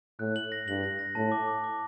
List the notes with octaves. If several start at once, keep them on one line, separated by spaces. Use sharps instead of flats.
A2 F#6
F#7
A#6
G2 F#7
A#6
A#6
A2 A5
D6
D6
D6